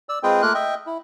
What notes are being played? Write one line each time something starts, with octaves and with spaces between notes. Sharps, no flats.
D5 E6
G#3 C4 F4 G#4 B4 G5
A3 A#3 F4 A#4 F#6
D#5 E5 G5
E4